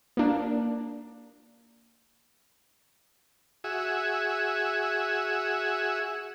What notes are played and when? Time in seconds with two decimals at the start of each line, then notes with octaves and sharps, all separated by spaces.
0.17 A#3 D4
3.64 F#4 G#4 E5